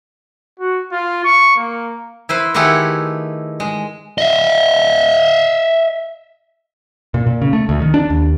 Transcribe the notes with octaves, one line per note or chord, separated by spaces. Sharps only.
F#4
F4
C#6
A#3
E4 B4 C5
D#3 A3 E4 G4 G#4 F#5
G#3
D#5 E5
A#2
A#2
C#3
A3
D2
D#3
D4
D#2